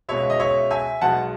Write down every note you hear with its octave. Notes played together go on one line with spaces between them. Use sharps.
C#2 B2 G#3 C#5 E5
D#5
C#5 E5
E5 G#5
B1 B2 G#3 B3 F#5 A5